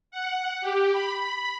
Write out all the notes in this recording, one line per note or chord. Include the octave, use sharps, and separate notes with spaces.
F#5
G4
B5